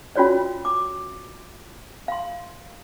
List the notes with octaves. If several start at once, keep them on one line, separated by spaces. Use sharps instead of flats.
C#4 F4 F#4 C#5 D5
D6
F5 C6